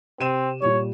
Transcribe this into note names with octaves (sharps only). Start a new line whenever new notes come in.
C3 C4 D#7 E7
A#2 G3 C#5